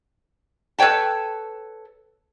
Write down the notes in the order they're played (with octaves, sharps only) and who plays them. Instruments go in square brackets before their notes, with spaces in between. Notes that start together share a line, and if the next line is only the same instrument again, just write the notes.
[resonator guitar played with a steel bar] A4 B4 C#5 G5 A5